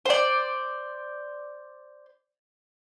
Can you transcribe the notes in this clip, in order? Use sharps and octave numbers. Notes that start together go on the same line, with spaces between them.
C5 D5